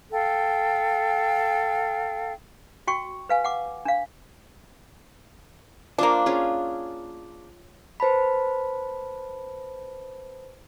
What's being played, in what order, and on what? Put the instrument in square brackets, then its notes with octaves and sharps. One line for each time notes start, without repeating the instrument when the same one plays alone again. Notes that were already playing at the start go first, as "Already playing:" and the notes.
[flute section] A4 F5 G5
[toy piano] F#4 G5 C#6
B4 F5 G#5
F#5 D6
D4 F5
[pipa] A#3 D4 [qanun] F4 C5
[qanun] C#4 F4 G#4
[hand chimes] B4 C5 A5 B5